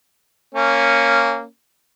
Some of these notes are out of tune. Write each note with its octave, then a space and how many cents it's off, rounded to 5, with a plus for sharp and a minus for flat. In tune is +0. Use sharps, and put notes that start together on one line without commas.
A#3 -10 C#4 +0